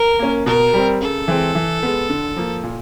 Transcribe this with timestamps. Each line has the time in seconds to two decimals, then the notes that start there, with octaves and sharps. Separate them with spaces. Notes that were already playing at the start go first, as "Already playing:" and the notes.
Already playing: A#4
0.19 A#3 C#4
0.46 B2 A#4
0.74 G3 C4
1.01 C#3 A4
1.28 E3 G#3 C4
1.55 E3
1.83 G#3 B3
2.10 D3
2.36 F3 A#3
2.63 A#2